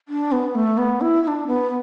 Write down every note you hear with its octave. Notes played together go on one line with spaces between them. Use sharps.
D4
B3
A3
B3
E4
E4
D4
B3